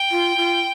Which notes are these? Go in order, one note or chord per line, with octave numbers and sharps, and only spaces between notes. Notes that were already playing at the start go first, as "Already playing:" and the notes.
Already playing: G5
F4
F4